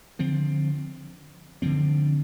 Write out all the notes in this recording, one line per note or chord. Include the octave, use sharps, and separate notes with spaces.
D3 F3 C4
D3 F3 C4